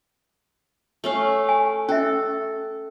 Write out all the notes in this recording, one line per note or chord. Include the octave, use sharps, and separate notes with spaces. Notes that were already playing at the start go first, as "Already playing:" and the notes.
A3 C#4 F5
G#5
C#4 A4 E5